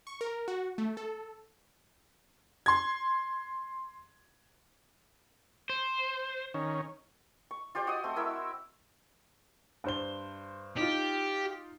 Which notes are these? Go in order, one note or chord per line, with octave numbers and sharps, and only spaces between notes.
C#6
A#4
F#4
A3
A4
C6 G#6
C5
D#3 C#4
C#6
F4 G4 C5 D5
F#4 D#5 D#6
A3 C4
E4 A#4 E5 E6
G2 C5 G7
D#4 F4 G4